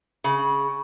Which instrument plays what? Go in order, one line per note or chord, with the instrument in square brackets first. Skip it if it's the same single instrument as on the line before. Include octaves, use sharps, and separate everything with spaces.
[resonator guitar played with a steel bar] C#3